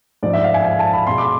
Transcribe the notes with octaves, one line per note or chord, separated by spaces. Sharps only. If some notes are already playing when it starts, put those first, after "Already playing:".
G#2 F3 G#3 D5
E5
F5
G#5
G#5
A5
B5
B2 G#3 C6
D6